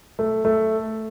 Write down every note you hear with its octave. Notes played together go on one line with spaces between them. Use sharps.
A3
A3